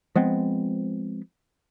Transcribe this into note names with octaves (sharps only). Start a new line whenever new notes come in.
F3 G#3 B3 C4